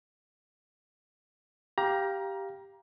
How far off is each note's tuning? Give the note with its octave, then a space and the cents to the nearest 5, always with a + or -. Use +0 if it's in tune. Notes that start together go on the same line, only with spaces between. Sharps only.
G4 +0 F5 +0 A#5 +25